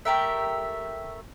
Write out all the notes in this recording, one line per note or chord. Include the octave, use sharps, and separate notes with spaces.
A3 G4 A#4 E5